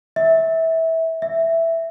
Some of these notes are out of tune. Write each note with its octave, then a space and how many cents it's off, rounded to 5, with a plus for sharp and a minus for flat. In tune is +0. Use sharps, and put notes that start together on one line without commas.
E5 -20
E5 +5